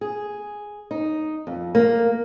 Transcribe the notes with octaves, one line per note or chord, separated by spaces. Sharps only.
G#4
D#4
F2
A#3